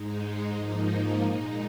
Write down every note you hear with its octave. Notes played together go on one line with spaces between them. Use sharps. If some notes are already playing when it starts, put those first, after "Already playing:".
Already playing: G#2 G#3 D#4
G#2 F3 A#3 D#4
A#2 G#3 D#4